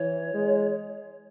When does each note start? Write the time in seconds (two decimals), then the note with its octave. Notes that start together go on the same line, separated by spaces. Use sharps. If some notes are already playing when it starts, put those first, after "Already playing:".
Already playing: E3 C#5
0.34 G#3